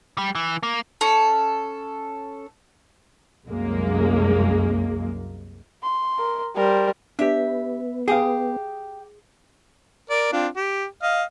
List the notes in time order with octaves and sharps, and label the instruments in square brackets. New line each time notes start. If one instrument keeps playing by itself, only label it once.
[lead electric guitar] G3
E3
A#3
[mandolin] C#4 A4
[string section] C2 F#2 G#3 A#3
[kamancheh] C6
[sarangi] A#4
[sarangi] G3 [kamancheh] A#4 C5
[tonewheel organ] B3 [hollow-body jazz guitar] D4 G4 [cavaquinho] E5
[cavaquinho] G4 D#6 [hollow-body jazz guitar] G#4 F5
[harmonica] A#4 D5
C4 D4 F4
G4
D#5 F5